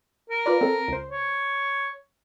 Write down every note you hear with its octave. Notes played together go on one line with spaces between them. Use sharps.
A#4
F4 B4 D5
C4 A4
C#2 C5
C#5